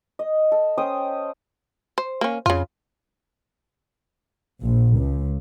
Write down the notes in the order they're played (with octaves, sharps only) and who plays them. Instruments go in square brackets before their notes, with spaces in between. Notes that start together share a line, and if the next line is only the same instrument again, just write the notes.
[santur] D#5
A4
C#4 C5 G5 D#6
[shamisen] C5
A#3 C#4
[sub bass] F2 [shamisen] C#3 F4
[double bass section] A#1
C#2